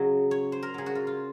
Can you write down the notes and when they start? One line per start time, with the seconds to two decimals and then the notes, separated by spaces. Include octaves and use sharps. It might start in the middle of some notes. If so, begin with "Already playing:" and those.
Already playing: C#3 F#3 D#5
0.31 C#5
0.52 C5
0.63 A#4
0.74 C#3 F#3 G#4
0.86 F#4
0.95 F4
1.07 F4